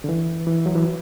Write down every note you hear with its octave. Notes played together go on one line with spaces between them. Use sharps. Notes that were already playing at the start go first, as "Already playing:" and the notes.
D3
E3
E3
F#3
E3